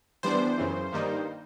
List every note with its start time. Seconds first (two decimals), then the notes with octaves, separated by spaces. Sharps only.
0.23 E3 G3 B3 D4 C5
0.58 F#2 C#3 E3
0.92 G2 D#3 G3 A#3 D#4